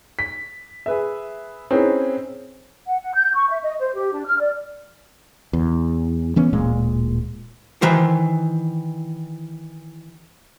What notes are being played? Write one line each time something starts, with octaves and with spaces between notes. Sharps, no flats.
B6
G#4 B4 E5
C4 C#4 D#4 E4 G#4 B4
F#5
F#5
G6
C#6
E5
D#5
C5
G4
D4
F6
D5
E2
E3 B3 C#4
D1 A#2 G#3
D#3 E3 C5